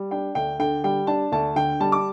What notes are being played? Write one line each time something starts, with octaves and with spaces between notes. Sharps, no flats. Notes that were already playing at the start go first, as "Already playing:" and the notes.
Already playing: G3
D4 G5
D2 G5
D3 G5
G3 G5
D4 A5
D2 A5
D3 G5
G3 A5
D6